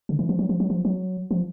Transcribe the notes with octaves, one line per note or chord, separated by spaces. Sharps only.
D3
E3
F3
F#3
F3
F#3
F3
F#3
F3